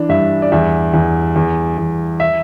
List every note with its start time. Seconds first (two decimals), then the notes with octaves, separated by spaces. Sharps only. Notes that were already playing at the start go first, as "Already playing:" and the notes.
Already playing: E3 D4
0.09 G2 E5
0.42 D5
0.52 E2 E5
0.94 E2
1.36 E2
1.78 E2
2.20 E5